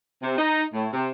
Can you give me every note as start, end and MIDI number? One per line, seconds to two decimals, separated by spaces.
0.22 0.35 48
0.38 0.65 63
0.73 0.89 45
0.93 1.09 48